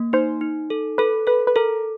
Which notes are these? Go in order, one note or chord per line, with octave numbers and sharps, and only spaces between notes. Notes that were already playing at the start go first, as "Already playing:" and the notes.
Already playing: A#3
D#4 C5
D#4
A4
A4 B4
A4 B4
B4
A4 A#4